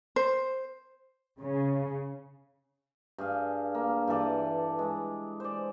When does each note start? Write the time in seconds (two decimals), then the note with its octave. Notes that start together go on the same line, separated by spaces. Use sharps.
0.16 C5
1.39 C#3
3.18 G2 G#4 F5
3.75 A#3
4.07 G2 E3 A4 D5
4.79 G#3
5.40 C5 D5